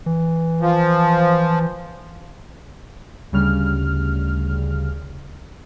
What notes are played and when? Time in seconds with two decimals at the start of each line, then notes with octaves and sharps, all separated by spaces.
0.06 E3
0.61 F3
3.32 D2 C#3 G3 F6